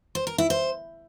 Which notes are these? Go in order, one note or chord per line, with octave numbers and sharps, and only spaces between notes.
C5
A#4
E4
C5